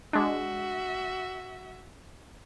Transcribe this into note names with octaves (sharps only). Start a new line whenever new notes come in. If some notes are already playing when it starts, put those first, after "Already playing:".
G#3 D4 F#4 E5